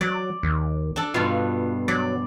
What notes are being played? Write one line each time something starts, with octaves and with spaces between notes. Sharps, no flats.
F#3 D5
D#2
D4 A4
G2 B2 F4
F#3 D5